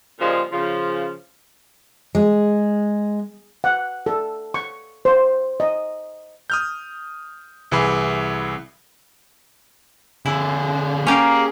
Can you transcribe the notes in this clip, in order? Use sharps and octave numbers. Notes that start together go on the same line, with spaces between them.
A#2 C#3 F3 G3 G#3
C#3 F3
G#3
F#5
A4
C#6
C5
D#5
D#6 F6 G6
C2 E3 G#4 B5
D3 E4 G#4
A#3 C#4 G4 G#4 A#4